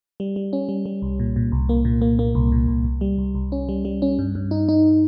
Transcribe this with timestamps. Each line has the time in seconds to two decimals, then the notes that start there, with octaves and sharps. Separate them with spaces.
0.20 G3
0.36 G3
0.53 C#4
0.69 G3
0.86 G3
1.02 C2
1.19 A#2
1.36 A#2
1.52 C2
1.69 A#3
1.85 A#2
2.01 A#3
2.19 A#3
2.35 C2
2.52 A#2
2.68 C2
2.85 C2
3.01 G3
3.18 C2
3.35 C2
3.52 C#4
3.69 G3
3.85 G3
4.02 C#4
4.19 G2
4.35 G2
4.51 D#4
4.68 D#4